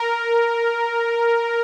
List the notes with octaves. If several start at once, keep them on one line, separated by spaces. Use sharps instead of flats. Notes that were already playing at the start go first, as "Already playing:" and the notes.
Already playing: A#4